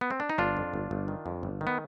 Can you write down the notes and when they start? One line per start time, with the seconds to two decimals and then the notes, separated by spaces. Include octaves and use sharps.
0.01 B3
0.11 C4
0.20 D4
0.30 D#4
0.38 G1 D4 F4
0.57 F2
0.74 G1
0.91 G1
1.08 D#3
1.26 F2
1.43 G1
1.61 D#3
1.67 B3